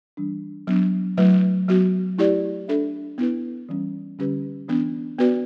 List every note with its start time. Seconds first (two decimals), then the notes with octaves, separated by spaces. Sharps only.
0.17 E3 G3 D4
0.67 F#3 B3 D4
1.17 F#3 A3 E4 B4
1.68 F#3 B3 F#4
2.18 A3 E4 G4 D5
2.68 D4 A4 E5
3.18 B3 E4 B4
3.69 E3 G3 C#4
4.19 D3 G3 C#4 G4 B4
4.68 E3 B3 D4
5.19 B3 F#4 B4 D5